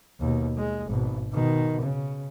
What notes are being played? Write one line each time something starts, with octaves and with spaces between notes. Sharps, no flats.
D#2 B2
G#3
G#1 B2
B2 D#3
C#3